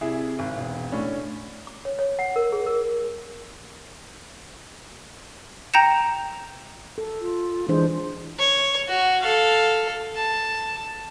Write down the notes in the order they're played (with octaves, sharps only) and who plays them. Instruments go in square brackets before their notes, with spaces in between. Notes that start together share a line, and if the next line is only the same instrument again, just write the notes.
[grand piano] C2 E4 G#4
G#1
E1
A2 C#4 D4
[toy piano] D6
C#5
C#5
F#5
A#4
G#4
A#4
[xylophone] G5 A#5 G6 A#6 C#7 E7
[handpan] A4
[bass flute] F4
[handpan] E3 D4 C5 [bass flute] G#3
[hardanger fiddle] C#5
F#4
A4 F5
A5